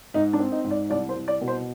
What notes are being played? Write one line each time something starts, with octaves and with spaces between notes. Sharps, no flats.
G#2 D#4
D4
C4
D#4
G#2
D5
C2 D5
C5
C2
D5
B2
C5